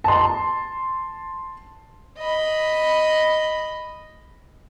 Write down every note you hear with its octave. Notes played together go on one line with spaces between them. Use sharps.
A5 C6
D#5 B5